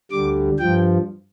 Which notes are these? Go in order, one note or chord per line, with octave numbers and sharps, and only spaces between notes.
D2 D3 G3 D6
G2 F3 G5